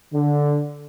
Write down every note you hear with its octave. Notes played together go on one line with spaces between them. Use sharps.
D3